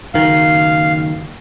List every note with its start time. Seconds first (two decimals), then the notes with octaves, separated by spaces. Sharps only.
0.14 F#1 D#3 F5